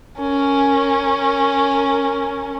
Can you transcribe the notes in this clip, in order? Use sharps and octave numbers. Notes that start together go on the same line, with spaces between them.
C#4 A#4